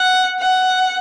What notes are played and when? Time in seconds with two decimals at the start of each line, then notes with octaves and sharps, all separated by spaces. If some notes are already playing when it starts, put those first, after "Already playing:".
Already playing: F#5
0.39 F#5